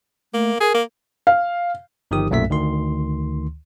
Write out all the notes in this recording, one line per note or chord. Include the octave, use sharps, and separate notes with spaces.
A3 A#3
G#4 A#4
A#3
F5
G1 D#3 F3 G4 D#6
B1 F#2 A#2 A3 E5 B6
D2 D#3 C6